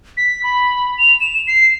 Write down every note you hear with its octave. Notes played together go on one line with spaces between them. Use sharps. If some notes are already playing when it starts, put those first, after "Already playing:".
B6
B5
F7
E7
C7